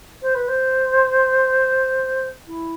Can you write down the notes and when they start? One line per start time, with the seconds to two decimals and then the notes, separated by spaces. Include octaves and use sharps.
0.22 C5
0.35 B4
0.48 C5
2.47 E4